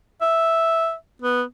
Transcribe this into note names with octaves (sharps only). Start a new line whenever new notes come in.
E5
B3